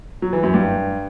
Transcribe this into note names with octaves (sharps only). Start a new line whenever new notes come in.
F#3
E3
F#2
G2